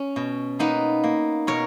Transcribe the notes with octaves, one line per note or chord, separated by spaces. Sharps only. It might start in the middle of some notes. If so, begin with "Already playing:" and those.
Already playing: C#4
B2
A#3 B3 D#4
A#3
B2 A#4 C#5